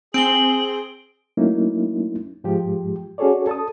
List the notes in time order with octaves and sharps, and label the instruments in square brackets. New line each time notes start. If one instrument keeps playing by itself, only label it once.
[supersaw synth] C4 [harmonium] G#4 [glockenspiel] D7 G7 [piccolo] F#7
[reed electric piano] F#3 A3 A#3 C#4 D#4 E4
G#2 F3 G#3 G4
C#4 F#4 G#4 A4 C#5 D5
A4 A5 D#6